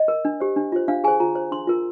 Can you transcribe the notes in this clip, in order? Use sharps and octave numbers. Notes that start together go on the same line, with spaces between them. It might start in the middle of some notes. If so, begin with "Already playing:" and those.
Already playing: D#5
A#4
D4
G4 C5
D4
F4 C5
D4 F5
G#4 C5 G#5
F4 A#5
C5
D4 C6
F4 A#4